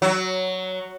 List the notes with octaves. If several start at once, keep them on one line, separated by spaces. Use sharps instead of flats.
F#3